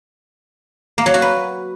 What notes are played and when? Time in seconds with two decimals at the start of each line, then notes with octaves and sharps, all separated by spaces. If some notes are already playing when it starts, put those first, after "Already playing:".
0.98 A#3
1.06 F#3
1.14 F#4
1.22 B4